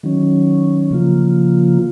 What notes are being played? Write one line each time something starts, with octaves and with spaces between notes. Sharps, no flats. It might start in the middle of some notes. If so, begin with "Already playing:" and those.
D#3 F#3 C#4
C#3 F3 A#3 F4